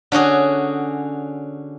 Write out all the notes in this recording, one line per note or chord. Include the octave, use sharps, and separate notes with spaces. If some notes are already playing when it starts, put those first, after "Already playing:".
D3 C#4 F#4 G#4